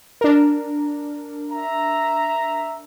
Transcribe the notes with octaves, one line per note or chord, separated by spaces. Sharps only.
D4 A#4
E5 A#5